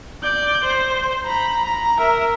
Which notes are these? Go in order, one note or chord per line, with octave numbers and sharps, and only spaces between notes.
D5 G6
C5
A#5 B5
A#5
A#4 E5